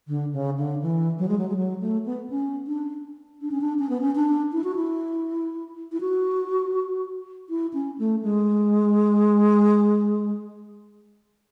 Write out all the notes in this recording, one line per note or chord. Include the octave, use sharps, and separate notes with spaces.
D3
C#3
D3
E3
F#3
G#3
F#3
G#3
F#3
A3
B3
C#4
D4
D4
C#4
D4
C#4
B3
C#4
D4
E4
F#4
E4
E4
F#4
E4
C#4
A3
G#3